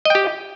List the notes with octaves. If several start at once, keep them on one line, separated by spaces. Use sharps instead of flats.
G4 D#5 G5